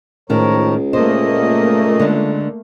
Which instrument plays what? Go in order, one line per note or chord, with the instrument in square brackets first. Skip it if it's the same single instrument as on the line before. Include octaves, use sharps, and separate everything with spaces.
[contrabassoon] C#2 [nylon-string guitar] A2 D#3 [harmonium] F3 A#4 C#5
[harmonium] A#2 D#5 [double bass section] A3 A#3 [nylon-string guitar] C5
[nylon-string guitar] D3 G#3